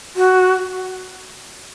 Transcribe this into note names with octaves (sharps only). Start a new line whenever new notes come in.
F#4